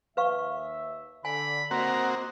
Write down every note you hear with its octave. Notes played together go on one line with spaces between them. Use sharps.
D#2 B4 E5 F5 C#6
D3 G#5 B5
A#3 C4 F#4 C5 D#5 A#5